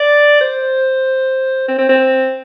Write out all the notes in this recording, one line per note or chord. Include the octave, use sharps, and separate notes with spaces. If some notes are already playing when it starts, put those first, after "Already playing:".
Already playing: D5
C5
C4
C4
C4